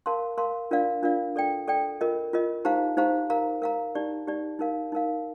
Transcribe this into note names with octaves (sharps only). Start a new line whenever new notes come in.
A#4 F5 A5 C6
A#4 F5 A5 C6
D4 F4 A#4 D5 F5
D4 F4 A#4 D5 F5
A4 D5 G5
A4 D5 G5
F4 A#4 D#5
F4 A#4 D#5
D#4 G4 C5 F5 A#5
D#4 G4 C5 F5 A#5
A#4 F5 A#5
A#4 F5 A#5
D#4 G4 D5
D#4 G4 D5
D#4 A#4 F5
D#4 A#4 F5